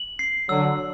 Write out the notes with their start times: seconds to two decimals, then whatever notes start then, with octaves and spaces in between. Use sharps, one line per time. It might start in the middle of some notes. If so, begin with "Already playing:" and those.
Already playing: F#7
0.19 C7
0.49 D3 F#3 E6